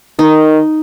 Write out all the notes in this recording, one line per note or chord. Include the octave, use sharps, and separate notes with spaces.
D#3 D#4